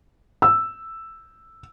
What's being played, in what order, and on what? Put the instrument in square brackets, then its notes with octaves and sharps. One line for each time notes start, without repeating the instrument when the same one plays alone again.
[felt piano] E6